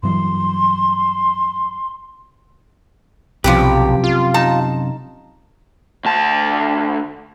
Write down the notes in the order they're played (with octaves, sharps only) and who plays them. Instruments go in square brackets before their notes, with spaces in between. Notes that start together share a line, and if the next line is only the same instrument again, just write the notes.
[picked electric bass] G2 E3 F#3 [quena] C6
[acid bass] B1 [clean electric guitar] F#2 C3 [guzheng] F3 G3 B4 [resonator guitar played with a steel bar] G4
[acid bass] F4
[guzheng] D#4 [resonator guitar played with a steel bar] A5
[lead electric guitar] D2 A5